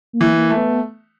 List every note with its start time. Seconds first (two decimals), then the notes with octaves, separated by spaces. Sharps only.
0.13 A#3
0.21 E3
0.36 A#3
0.50 A3
0.57 B3